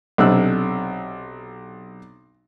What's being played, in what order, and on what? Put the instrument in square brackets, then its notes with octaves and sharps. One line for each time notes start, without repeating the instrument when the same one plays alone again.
[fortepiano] B1 C3 C4 D4 E6 F#6